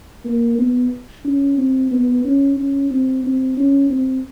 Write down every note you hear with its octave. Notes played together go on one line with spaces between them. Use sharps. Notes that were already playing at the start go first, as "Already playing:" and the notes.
A#3
B3
C#4
C4
B3
C#4
C#4
C4
C4
C#4
C4